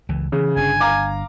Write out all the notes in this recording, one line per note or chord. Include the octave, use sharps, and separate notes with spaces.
C#2 E3
C#3 E3
G1 C#4 D4 G#5
F5 A#5 D6